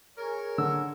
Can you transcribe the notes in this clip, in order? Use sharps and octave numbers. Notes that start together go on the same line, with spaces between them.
G#4 A#4 C#5
D3 E6